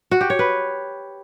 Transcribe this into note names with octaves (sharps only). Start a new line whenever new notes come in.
F#4
G4
C#5
B4